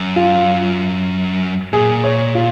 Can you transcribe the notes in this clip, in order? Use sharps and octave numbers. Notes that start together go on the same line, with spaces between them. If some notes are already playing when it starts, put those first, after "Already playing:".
Already playing: F#2
F4
A#2 G#4
C#5
F4